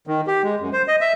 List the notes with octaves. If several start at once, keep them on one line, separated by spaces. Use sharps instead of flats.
D#3
G4
G#3
F#2
C5
D#5
E5